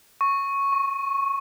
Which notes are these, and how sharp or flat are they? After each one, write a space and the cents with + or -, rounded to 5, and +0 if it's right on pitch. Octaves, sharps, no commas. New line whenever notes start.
C#6 -5
C#6 -45